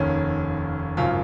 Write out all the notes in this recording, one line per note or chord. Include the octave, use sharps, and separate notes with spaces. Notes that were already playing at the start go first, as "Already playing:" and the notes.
Already playing: F1 D#2 D#3 C#4
G#1 F#2 C#3 F4